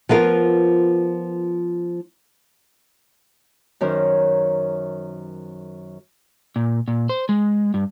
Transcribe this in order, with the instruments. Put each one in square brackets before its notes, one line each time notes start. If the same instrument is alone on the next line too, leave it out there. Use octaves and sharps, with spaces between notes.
[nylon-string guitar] F3 B3 F4 A#4
[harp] F#2 D#3 C#4 A#4 C5
[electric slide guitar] A#2
A#2
C5
G#3
G2